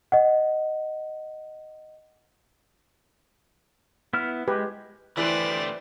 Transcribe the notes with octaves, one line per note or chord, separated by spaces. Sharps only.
D#5 F#5
B3 E4 F6
G#3 G4 B4
D3 E3 A3 G4 B4 C5 D5